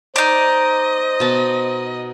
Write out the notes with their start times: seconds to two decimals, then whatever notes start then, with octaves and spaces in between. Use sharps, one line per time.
0.16 D#4 C5 D5 D#5
1.20 B2 A5